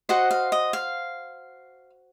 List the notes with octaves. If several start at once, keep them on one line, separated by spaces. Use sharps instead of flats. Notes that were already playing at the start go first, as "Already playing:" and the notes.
F#4 C5 D#5 F#5
F5
D#5
F5